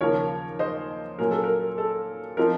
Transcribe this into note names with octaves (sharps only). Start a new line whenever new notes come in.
D#2 C#3 F3 A#4 C#5
C5 D#5
A#2 F#3 A#3 C#4 A#4
A4
A#4
A4
F3 C4 D#4 A#4